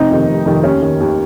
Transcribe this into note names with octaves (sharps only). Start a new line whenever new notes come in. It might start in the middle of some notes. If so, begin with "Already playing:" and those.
Already playing: F1 C4 D#4
F2 C3 D#3
F1
F2 C3 D#3
D#2 C#4
D#3
D#2